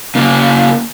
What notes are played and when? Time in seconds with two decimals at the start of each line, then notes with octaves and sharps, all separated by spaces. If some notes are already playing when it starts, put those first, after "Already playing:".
0.15 C#3 A#3